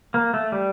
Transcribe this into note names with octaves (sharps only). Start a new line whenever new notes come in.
A#3
A3
G3